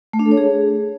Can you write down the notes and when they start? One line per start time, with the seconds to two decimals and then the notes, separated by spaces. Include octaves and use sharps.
0.13 A3
0.19 D4
0.25 A4
0.31 C#5
0.37 G#4